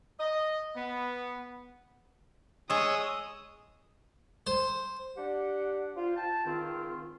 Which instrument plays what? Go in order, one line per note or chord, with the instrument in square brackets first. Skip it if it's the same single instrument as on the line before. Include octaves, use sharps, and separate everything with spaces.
[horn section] D#5
B3
[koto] G#3 G#4 [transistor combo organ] C#5 D#5 E6 [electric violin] D#6
[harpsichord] C5
[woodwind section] D4 G4 F#5
F4 C5
G5 A5
C#2 G#2 D#3 C4 F4